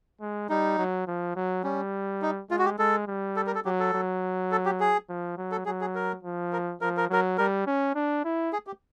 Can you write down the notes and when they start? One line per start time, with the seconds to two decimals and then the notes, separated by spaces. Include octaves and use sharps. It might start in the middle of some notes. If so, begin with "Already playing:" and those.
0.21 G#3
0.49 G3 D#4
0.78 F#3
1.07 F3
1.36 F#3
1.64 G3 C#4
2.22 D#4
2.50 G#3 F4
2.59 F#4
2.65 G4
2.79 G#3 A4
3.08 G3
3.36 A4
3.47 A#4
3.55 A4
3.65 F#3 G4
3.80 A4
3.94 F#3
4.52 A4
4.66 G4
4.80 G#4
5.09 F3
5.37 F#3
5.52 A4
5.65 F#3 G#4
5.81 G#4
5.95 A#4
6.23 F3
6.53 A#4
6.81 F3 A#4
6.97 A#4
7.09 F#3 A#4
7.38 G3 A#4
7.67 C#4
7.95 D4
8.25 E4
8.53 G#4
8.67 G4